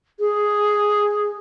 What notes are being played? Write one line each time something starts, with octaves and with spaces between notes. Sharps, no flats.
G#4